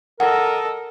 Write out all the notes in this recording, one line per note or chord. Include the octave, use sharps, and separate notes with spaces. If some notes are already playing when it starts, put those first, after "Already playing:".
A4 A#4 D#5 F#5